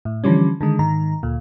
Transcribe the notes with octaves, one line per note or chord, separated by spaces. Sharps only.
A2
D3 E3 F3 G3 C#4
D3 D#3 G#3
G#2 D#3 A#5
D2 A#2